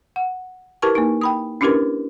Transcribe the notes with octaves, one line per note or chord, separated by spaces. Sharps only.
F#5
E4 G4 A#4 B4 A5 C#6
A#3 D#4
G5 B5 D#6
C#4 D4 E4 G4 A#4 B4